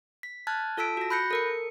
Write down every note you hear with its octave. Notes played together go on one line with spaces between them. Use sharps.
B6
A5 F6 F#6 G#6 A6
F4 A4 A5 E6 B6 D7
F#4 A#6
B5 F#6 G6 A#6 C#7
A4 A#4 C#7